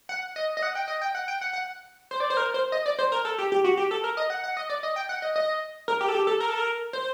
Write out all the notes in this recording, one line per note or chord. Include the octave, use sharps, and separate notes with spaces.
F#5
D#5
D#5
F#5
G5
D#5
G5
F#5
G5
F#5
F#5
C5
D5
C5
A#4
C5
D#5
D5
C5
A#4
A4
G4
G4
F#4
G4
A4
A#4
D#5
F#5
F#5
D#5
D5
D#5
G5
F#5
D#5
D#5
A#4
G4
A4
G4
A4
A#4
A4
A#4
C5